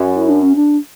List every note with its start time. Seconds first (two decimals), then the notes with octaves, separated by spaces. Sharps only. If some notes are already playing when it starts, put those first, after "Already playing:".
Already playing: F#2
0.15 E4
0.28 D4
0.42 C#4
0.55 D4